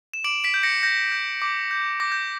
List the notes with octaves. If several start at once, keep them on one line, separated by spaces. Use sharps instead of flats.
E7
D6 D7 F#7
B6 D7
G6
A#6 C#7
G6 A#6
G6
D6
G6
D6 A#6
G6